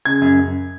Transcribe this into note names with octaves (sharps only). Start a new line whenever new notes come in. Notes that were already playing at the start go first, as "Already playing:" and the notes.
C#3 G#6
F#2
F#2